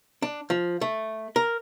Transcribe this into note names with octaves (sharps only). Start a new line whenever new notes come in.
D4
F3
A3
A#4